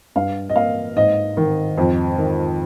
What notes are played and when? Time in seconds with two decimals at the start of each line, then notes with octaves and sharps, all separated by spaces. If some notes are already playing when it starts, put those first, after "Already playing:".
0.16 G2 F5
0.49 D#5
0.55 A#3 F5
0.96 G#2 D#5
1.37 D#3
1.78 F2
2.18 D#3